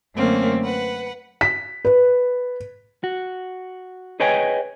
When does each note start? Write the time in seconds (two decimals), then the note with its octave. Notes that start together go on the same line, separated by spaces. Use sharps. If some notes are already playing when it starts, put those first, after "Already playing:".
0.15 F#2 D3 A3 A#3 C4 C#4
0.63 B4 F#5
1.41 B6
1.85 B4
3.04 F#4
4.20 G#4 B4 C#5 D#5 G5 G#5